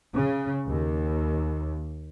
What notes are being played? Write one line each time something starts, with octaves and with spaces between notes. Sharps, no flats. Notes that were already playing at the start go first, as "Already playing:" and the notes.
C#3
D#2